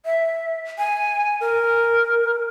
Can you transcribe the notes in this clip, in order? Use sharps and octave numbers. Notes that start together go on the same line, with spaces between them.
E5
G#5
A#4